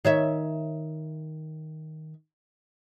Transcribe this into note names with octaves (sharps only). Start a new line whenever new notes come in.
D#3 C#5 E5